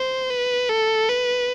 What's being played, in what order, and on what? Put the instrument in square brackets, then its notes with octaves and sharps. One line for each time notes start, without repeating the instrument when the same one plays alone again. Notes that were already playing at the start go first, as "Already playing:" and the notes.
Already playing: [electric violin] C5
B4
A4
B4